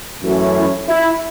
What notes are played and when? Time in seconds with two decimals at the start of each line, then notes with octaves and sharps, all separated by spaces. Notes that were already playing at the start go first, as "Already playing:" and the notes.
0.22 F#2 E3 A3 C#4 F#4
0.56 E4
0.89 E4